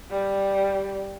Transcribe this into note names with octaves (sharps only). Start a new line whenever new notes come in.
G3